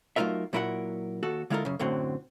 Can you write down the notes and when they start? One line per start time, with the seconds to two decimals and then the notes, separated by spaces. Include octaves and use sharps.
0.16 F#3 A3 D#4 F4 A#4 E5
0.53 A#2 F#3 E4 A#4 D#5 F#5
1.23 D#2 F#4 A4
1.50 D3 G#3 E4 F4 A4 A#4
1.65 F#2 C#3
1.79 F#2 A2 D3 F#3 C4